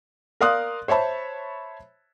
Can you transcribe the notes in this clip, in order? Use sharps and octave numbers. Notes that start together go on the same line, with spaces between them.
A#4 D5 F5 C6 D#6 F#6
C5 C#5 E5 A5 B5